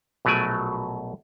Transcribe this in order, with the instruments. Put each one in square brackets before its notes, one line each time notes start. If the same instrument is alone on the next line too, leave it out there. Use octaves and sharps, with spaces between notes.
[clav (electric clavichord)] A#1 B2 F#3 A3 D5 G#5